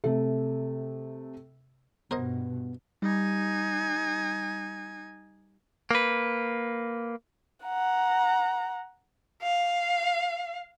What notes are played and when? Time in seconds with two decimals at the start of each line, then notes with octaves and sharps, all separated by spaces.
0.04 C3 A3
2.11 G2 B2 B3 A#4 C5 D#5
3.02 G3 D#4 G#5
5.91 A#3 B4
7.65 F#5 A#5
9.43 F5